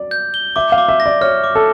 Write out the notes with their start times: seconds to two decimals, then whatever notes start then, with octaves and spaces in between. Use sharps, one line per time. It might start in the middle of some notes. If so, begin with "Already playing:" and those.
Already playing: D5
0.11 G6
0.34 G7
0.56 E5 D6
0.72 F5
0.78 D6
0.89 E5
1.00 A#6
1.06 D5
1.21 C#5 F6
1.44 D6
1.55 A4